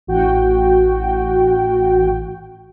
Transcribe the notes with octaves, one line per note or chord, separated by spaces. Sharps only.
A1 F#4 G5